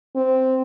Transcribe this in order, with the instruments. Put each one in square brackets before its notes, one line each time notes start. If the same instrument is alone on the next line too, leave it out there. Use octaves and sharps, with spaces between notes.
[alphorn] C4